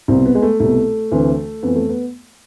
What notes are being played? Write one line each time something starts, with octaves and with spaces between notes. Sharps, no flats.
C2 B2 C4
B3
G#3
A3
C2 B2 A3
D2 C3 E3
F2 E3 B3
A3
B3